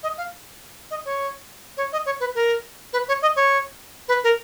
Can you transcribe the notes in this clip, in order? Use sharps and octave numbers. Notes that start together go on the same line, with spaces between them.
D#5
F5
D#5
C#5
C#5
D#5
C#5
B4
A#4
B4
C#5
D#5
C#5
B4
A#4